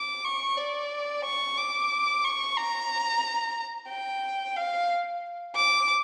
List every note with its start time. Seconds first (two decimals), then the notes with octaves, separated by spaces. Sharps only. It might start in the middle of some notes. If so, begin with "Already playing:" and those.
Already playing: D6
0.25 C#6
0.57 D5
1.24 C#6
1.57 D6
2.24 C#6
2.56 A#5
3.89 G5
4.56 F5
5.56 D6